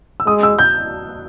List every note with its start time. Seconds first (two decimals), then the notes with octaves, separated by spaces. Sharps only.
0.20 E6
0.27 G#3 D#6
0.43 E6
0.59 G6